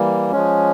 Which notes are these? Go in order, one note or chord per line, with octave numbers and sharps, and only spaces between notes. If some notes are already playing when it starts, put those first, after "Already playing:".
Already playing: E3 G3 A#3
F3 G#3 C#4